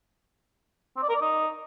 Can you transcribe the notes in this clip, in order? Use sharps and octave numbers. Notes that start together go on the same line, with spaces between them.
C4
D5
A#4
D5
D#4